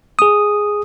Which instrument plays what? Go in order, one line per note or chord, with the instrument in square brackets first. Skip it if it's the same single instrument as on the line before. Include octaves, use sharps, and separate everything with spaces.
[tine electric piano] G#4 D#6